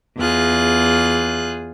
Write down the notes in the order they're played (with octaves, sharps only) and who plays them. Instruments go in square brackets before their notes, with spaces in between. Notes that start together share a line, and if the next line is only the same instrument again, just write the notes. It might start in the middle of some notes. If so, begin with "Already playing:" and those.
[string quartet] E2 F4 G#4 F#6